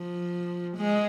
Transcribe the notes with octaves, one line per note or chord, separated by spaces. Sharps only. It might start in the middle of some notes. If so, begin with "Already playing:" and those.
Already playing: F3
G#3